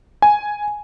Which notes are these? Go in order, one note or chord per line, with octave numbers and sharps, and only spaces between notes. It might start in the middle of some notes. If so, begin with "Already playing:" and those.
G#5